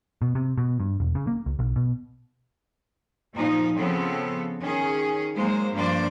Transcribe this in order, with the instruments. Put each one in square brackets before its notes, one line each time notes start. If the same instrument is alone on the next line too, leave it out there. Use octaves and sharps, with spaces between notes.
[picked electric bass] B2
C3
B2
G2
E1
C#3
A#3
C#2
B1
B2
[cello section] A#2 F3 D#4
C#3 F3 B3 C4 A4
D#3 C#4 G#4
F#3 G#3 A#3 C5
G2 F3 A#3 D4 C5 D5